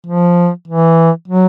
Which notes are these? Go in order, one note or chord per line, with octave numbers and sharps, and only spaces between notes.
F3
E3
F#3